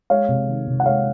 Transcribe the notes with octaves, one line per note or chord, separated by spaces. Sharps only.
G#3 C#5 F5
C3
D#3
C3
F#5
G#3 C#5 F5